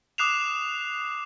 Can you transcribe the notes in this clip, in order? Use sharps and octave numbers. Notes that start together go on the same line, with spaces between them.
D6 D#6 F#6 C7 E7 F7